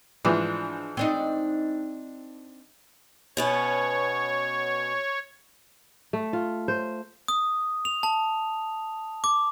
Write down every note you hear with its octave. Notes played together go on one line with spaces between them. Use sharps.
G#2 E3 F3 D4
C4 D4 D#4
B2 B3 C#4 C#5
A3
F4
C5
D#6
F7
A5
D6